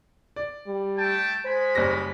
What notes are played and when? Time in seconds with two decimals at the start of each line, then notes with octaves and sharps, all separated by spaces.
0.36 D5
0.67 G3
0.97 A3 G5 A5
1.45 G#3 C5 G#5 B5
1.75 F#1 G3 A#6